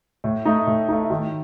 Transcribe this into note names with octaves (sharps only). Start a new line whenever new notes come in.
A2
A3 D#4
A2
A3 D#4
D#3